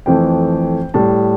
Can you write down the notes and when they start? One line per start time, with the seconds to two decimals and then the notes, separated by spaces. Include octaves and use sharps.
0.06 F2 E3 A3 G5
0.94 A2 G3 A5